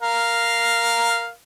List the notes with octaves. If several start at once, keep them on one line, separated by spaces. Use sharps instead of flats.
A#4 F5